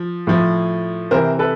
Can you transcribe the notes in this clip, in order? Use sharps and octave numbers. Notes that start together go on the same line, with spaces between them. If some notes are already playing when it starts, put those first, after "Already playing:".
Already playing: F3
A2 F3
C3 E3 A#4 C5
A4 B4